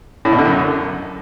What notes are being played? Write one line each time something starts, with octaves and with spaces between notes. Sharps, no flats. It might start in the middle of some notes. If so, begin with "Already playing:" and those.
A2
B2
D3
F#2